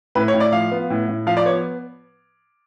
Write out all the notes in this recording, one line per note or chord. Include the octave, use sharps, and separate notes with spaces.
A2 B4
C#5
A2
D5
F3 F5
B3
A2
A2
F3 F5
D5
B3 C#5